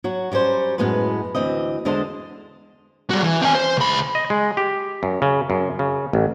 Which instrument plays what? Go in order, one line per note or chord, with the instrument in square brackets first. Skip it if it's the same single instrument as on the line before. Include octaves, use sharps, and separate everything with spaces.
[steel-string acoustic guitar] F#3 F#4
F#3 G3 C#4 C5
F#2 A2 G#3 B3 B4
D2 E3 C4 D#5
E2 D3 G#3 C5 D#5 A5
[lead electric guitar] G3 F#4
E3
C4 G#5
C5
C#2 B5
[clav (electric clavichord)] D#5
G#3
G4
F#2
C#3
F#2
C#3
A1